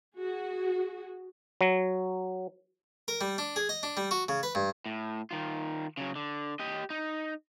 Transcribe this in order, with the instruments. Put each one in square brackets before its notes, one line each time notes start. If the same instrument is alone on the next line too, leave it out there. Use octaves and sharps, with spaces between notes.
[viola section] F#4 G#4
[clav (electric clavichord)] F#3
[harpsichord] A#4
G3
D4
G#4
D#5
D4
G3
F#4
C#3
B4
G2
[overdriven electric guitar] A2
D#3 F4
C#3 F#3
D3
G4 D#5
D#4